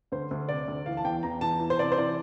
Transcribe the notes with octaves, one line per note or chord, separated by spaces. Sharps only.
D2 C5
D2
C3 D5
D2
E3 F5
A5
E2 G5
E2 A#5
E2 A5
E3
C5
C3 D5
C5
E3 D5